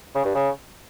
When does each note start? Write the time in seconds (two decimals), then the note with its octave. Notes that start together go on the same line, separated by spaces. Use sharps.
0.15 C#3
0.25 G2
0.35 C#3